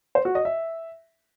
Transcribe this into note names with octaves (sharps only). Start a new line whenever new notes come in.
C5
F#4
D#5
E5